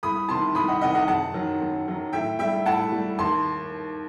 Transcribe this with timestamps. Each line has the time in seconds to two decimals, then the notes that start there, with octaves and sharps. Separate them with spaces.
0.03 C2 B5 D#6
0.29 C3 D#3 A5 C6
0.55 C2 B5 D#6
0.68 D#5 F#5
0.81 C3 D#3 D#5 F#5
0.95 D#5 F#5
1.07 F#2 F#5 A5
1.34 D#3 F#3
1.61 F#2
1.87 D#3 F#3
2.13 A2 E5 G5
2.39 G3 E5 G5
2.65 A2 F#5 A5
2.92 G3
3.19 D#2 A5 C6